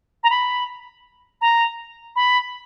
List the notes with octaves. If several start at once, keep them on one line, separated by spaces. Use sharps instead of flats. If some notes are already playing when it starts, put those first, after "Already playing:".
A#5
B5
A#5
B5